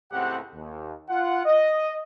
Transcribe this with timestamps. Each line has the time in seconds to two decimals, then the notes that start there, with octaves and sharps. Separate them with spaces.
0.11 C#2 A2 C4 G4 F#5
0.54 D#2
1.09 F4 F#5
1.46 D#5